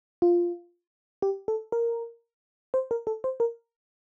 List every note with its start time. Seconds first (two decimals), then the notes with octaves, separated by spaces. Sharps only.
0.22 F4
1.22 G4
1.48 A4
1.72 A#4
2.74 C5
2.91 A#4
3.07 A4
3.24 C5
3.40 A#4